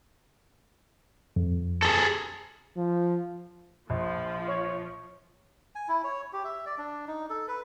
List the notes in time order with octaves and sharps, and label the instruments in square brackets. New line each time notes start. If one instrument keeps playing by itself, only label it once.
[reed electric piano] F2
[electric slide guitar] G#4 A4
[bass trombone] F3
[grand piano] A#1 [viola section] F3
[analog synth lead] C#5
[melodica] G#5
E4
C#5
G4
E5
D5
D4
D#4
A4
B4